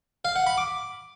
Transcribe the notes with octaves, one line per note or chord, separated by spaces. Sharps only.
F5
F#5
B5
D6